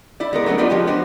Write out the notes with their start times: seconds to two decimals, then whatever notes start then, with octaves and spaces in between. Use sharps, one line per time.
0.20 E4 D5
0.33 G#3 B3 A#4
0.46 F#3 A3 B3 C#4 D4
0.58 G3 B3 D4 F4 D5 D#5
0.70 F3 G#3 G4
0.87 B3 D4 F#4 C5